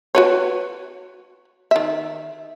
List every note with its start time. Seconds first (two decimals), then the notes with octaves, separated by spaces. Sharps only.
0.15 F#4 B4 C#5
1.71 D#3 E5